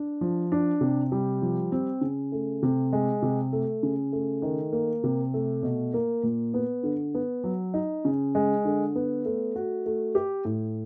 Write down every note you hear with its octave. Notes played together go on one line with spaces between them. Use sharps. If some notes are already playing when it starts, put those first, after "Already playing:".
Already playing: D4
F3
D4
C3
G3
F3
C4
C#3
A3
C3
G#3
C3
A3
C#3
A3
D#3
A#3
C3
A3
B2
A#3
A#2
B3
D3
B3
F#3
D#4
C#3
G#3
D3
B3
A3
F#4
A3
G4
A2